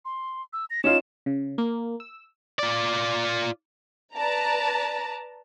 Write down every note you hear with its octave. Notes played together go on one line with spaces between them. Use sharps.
C6
E6
A#6
C#4 D#4 F4 E7
C#3
A#3
E6
F4 D5
B4 D5 A5 A#5